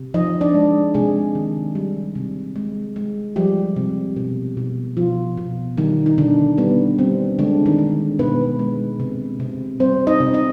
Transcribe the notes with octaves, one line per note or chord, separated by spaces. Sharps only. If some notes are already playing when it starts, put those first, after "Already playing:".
Already playing: C3
F3 D#4 D#5
D4 D5
G#3
C3 G#3 G#4
D#3
G3
C3
G#3
G#3
F3 G3 G4
C3
B2
B2
B2 F3 F4
B2
D#3 G3 D#4
D#4
B2 D3 D4
G3 B3
G3 C4
D3 G#3 D4
D#3 D#4
G#3
B2 B3 B4
G#3
C3
C3
G3 C4 C5
D#4 D#5
C3
D#4 D#5